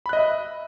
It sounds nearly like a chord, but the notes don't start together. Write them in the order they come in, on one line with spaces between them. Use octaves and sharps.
B5 F#6 D#5 E5